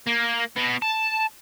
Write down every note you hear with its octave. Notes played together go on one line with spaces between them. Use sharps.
A#3
B2 B3
A5